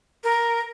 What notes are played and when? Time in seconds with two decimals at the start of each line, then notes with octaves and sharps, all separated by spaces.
0.24 A#4